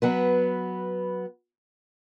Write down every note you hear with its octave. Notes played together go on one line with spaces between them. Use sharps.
F#3 B3 B4